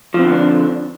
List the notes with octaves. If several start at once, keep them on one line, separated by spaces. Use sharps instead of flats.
D3 F3 B3 C4 D4